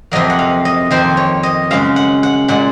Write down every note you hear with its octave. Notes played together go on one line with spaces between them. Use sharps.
F2 C3 F#3 A#3 D#5
F#5
F5
D#5
F2 D#3 A#3 C5
C#5
D#5
F#2 C#3 G#3 F5
F#5
F#5
A#2 G#3 F#5